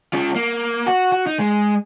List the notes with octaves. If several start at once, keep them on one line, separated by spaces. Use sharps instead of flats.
C#4 F4
A#3
F#4
F#4
D#4
G#3